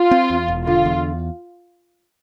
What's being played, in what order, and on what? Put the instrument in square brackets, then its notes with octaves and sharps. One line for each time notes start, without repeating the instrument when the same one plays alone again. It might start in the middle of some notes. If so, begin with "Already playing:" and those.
Already playing: [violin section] F4
[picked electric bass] C4
E2
E1
[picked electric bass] D3 [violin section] F4
[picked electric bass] E2